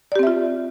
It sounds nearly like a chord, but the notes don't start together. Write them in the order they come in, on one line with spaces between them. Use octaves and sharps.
D5 G4 C4 E5 F4